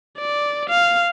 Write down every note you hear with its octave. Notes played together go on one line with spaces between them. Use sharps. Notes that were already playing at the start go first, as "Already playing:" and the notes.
D5
F5